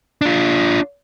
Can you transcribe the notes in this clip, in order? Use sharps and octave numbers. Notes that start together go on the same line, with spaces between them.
D4 F4